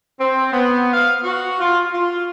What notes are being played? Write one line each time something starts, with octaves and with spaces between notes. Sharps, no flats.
C4
B3
F5
F#4
F4
F4